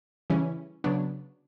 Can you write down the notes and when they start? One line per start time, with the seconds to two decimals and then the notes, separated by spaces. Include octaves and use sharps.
0.30 C#3 E3 G3 C#4 E4
0.84 C#3 F#3 B3 D4